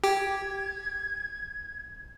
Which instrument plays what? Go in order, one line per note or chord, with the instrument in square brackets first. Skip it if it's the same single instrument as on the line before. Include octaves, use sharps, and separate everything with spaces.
[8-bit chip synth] G4 [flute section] G#6